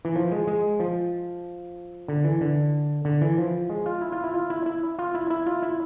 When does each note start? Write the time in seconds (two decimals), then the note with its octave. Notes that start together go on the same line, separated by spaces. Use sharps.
0.05 E3
0.15 F3
0.32 G#3
0.47 G#3
0.80 F3
2.08 D3
2.24 E3
2.41 D3
3.05 D3
3.21 E3
3.38 F3
3.70 G#3
3.86 F4
4.01 E4
4.12 F4
4.24 E4
4.34 F4
4.50 E4
4.66 E4
4.99 F4
5.14 E4
5.30 E4
5.46 F4
5.63 E4